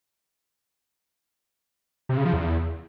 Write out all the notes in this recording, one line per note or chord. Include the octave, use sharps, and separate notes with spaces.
C3
C#3
F3
E2